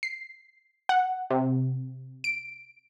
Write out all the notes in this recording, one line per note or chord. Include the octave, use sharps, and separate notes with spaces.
C7
F#5
C3
D7